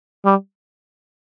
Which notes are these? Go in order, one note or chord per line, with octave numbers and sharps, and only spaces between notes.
G3